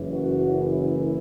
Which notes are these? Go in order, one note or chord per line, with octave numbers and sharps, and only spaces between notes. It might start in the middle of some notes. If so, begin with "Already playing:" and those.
Already playing: F#1 F#2 E3
F#4
E4